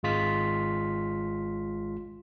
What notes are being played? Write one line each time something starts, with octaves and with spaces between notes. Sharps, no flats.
G#1 G#3 F4 B6